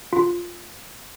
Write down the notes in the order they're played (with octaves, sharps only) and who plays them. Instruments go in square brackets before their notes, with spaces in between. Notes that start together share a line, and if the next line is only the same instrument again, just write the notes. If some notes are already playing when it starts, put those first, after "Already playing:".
[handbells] F4